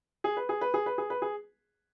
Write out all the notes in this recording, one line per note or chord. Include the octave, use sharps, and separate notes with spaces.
G#4
B4
G#4
B4
G#4
B4
G#4
B4
G#4